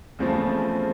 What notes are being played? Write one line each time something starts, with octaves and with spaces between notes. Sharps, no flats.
E2 C#3 F3 A3 C4